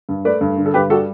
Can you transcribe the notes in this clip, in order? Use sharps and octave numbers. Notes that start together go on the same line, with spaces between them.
G2
A3 B4 D5
G2
D3
A4
G2 G4 B4
G3 F#4 A4